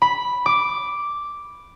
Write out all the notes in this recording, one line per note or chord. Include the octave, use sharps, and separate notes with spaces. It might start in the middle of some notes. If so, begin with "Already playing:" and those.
B5
D6